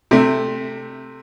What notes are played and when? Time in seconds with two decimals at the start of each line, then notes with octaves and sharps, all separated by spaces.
0.11 C3 A3